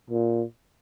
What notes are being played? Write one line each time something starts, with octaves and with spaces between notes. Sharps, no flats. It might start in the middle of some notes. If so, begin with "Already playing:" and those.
A#2